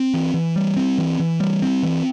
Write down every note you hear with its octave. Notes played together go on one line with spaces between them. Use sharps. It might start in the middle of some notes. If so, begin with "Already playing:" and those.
Already playing: C4
E3
E3
G3
C4
E3
E3
G3
C4
E3